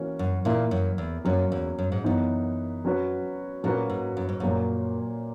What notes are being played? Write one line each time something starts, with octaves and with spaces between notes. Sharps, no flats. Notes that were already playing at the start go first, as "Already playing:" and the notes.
Already playing: E3 A#3 C#4 F#4 A#4
F#2
A#2 E3 A#3 E4 A#4
F#2
E2
F#2 F#3 A#3 C#4
E2
F#2
G#2
F#2 E3 B3 D#4
F#3 C#4 F#4 B4
A#2 F#3 A#3 C#4 F#4 B4
G#2
F#2
G#2
F#2 A#2 F#3 A#3